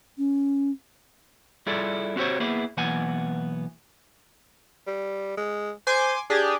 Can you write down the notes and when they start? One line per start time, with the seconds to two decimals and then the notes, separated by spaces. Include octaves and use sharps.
0.18 C#4
1.66 G3 E4 F4 G#4 A4 D5
2.16 C4 F#4 G4 C5 C#5
2.40 A#3 B3 E4 G#4
2.77 B1 E3 A#3 B3 F#5 G#5
4.87 G3
5.37 G#3
5.87 C5 G#5 C6 D6
6.30 D4 G4 G#4